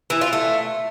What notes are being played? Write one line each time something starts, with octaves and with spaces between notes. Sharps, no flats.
E3
F4
A3